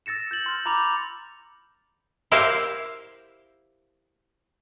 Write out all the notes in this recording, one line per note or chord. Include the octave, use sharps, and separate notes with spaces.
E6 A6 A#6 C#7 E7
G6 A6 F#7
C6 F6 G6
A#5 B5 D6 G6 F7
E4 G4 A#4 C5 E5 F5